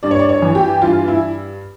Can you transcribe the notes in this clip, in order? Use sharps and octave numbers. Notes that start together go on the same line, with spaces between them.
G2 D5
C#5
D5
C#5
E3
G4
G2 F4
E4